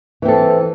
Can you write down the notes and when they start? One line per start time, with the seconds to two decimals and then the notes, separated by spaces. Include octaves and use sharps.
0.22 E3
0.25 C4
0.28 A4